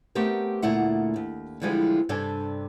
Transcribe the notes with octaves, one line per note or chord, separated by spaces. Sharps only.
A3 B3 C4 G4 A#4
D2 A#2 A3 E4 F#5
D#2
D3 E3 F3 G3 G#3
G2 C3 D4 A4 G#5